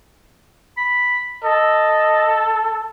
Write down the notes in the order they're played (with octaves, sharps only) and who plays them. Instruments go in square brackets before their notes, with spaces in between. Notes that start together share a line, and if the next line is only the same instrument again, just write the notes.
[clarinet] B5
[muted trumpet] A4 [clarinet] D#5